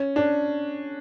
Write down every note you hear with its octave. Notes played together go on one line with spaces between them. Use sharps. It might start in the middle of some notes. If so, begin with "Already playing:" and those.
Already playing: C#4
D4